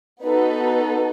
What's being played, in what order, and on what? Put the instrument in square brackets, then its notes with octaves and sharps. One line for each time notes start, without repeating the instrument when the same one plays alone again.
[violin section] B3 D#4 F#4 A4 B4